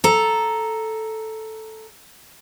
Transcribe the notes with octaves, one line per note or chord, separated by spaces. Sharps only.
A4 A#5